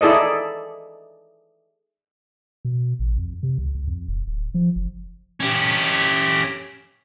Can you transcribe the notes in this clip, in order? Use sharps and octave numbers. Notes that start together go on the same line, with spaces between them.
D#4 E4 G#4 A4 D5 D#5
B2
A1
F2
C3
C#2
D2
F2
E1
D1
F3
F#1
C#4 G4